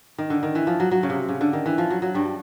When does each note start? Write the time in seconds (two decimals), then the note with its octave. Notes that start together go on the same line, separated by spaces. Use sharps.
0.18 D#3
0.30 D3
0.43 D#3
0.55 E3
0.67 F3
0.80 F#3
0.91 F#3
1.03 C#3
1.10 C3
1.29 C#3
1.41 D3
1.53 D#3
1.66 E3
1.78 F3
1.90 F#3
2.02 F#3
2.14 G2 G3